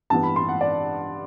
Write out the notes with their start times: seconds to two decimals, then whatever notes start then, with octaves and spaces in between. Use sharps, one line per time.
0.10 G2 E3 B3 A5
0.23 B5
0.36 C6
0.49 F#5
0.61 D5